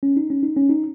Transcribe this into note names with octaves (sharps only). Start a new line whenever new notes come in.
C#4
D#4
C#4
D#4
C#4
D#4